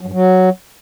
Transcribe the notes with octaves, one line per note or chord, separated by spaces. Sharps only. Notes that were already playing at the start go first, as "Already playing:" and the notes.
F#3
G2
F#3